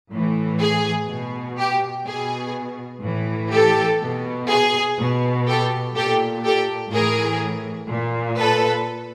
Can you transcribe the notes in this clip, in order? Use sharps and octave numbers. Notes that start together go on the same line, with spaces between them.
A2 E3
G#4
B2
G4
B2 G#4
A2 E3
G4 A4
B2
G#4
B2
G4 A4
A#2 G4 A4
G4 A4
A2 E3 G#4 A#4
A#2
A4 B4